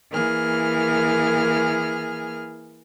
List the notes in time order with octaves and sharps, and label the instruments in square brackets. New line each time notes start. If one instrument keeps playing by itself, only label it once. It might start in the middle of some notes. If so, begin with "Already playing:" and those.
[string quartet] E3 A#3 G#4 F6